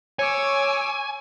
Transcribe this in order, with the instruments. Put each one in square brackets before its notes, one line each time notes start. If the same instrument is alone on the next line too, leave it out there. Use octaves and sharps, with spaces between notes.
[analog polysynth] C#5 [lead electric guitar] G#5 [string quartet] D6 E6 G#6